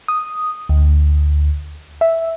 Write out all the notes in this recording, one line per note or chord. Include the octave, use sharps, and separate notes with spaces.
D#6
D2
E5